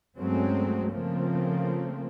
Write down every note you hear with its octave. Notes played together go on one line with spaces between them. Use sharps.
G2 F#3 G#3 A3 C4 C#4
C#3 F3 A3 A#3 C4